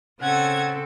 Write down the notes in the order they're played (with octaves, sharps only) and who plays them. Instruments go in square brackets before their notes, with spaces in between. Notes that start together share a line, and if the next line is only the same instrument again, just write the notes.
[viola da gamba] C#3 C4 A4 [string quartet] C#4 G#6 [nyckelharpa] F#5